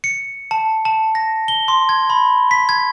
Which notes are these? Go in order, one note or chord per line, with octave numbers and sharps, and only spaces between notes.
C#7
A5
A5
A#6
G7
C6
G#6
B5
B6
G#6